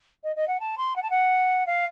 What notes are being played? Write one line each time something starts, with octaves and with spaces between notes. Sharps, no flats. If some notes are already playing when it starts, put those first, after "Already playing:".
D#5
D#5
F#5
A5
C6
F#5
A5
F#5
F5